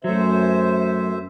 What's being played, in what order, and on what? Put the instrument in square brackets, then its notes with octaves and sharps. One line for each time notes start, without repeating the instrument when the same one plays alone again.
[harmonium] F#2 C5 E5 [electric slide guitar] F#3 A3